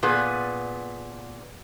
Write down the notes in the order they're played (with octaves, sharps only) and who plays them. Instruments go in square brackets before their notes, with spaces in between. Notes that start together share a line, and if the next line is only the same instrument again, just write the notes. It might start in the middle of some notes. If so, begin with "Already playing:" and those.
[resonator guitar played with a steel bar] A#2 B3 G#4